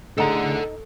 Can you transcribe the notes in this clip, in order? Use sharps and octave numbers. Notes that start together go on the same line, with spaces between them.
A2 D3 A3 D#4 G#4 A4 F#5 A#5